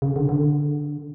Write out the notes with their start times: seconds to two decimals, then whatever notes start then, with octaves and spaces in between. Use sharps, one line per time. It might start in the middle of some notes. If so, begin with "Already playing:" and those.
0.02 C#3
0.16 D3
0.29 D3